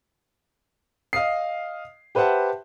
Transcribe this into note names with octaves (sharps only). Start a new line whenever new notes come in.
D#5 F5 D#6 C7
G4 B4 C5 E5 F#5 A5